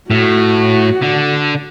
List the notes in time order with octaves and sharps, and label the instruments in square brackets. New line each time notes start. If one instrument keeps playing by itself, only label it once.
[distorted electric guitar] A2 [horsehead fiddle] F#4
[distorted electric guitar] D3